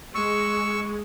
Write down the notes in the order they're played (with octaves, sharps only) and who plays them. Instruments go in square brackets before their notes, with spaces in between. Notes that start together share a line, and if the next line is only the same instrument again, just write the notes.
[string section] G#3 [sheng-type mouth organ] C#6 E6